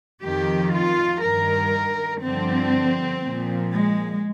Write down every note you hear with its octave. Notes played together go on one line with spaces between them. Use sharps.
F2 D#3 G4
F4
G2 D#3 A#4
G2 D3 F3 C4
A#2 F3
G#3